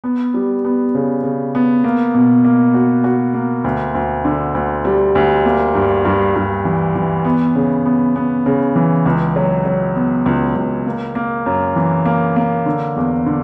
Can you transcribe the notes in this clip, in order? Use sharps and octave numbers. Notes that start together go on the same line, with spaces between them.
B3
G3
B3
C#3
C#3
B3
A#3
B2
A#3
F#4
F#4
A#3
D2
D2
D3
D2
G3
D2
A#3
G2
G2
G2
E3
E3
B3
C#3
B3
B3
C#3
E3
C#2
F#3
F#3
B3
C#2
C#2
A#3
A#3
F#2
E3
A#3
A#3
D3
E2
D3